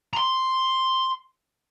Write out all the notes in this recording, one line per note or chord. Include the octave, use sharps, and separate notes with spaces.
A#5 C6